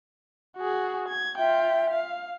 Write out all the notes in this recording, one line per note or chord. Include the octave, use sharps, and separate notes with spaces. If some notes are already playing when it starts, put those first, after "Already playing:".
F#4 G#4
G#6
F4 E5 G5
F5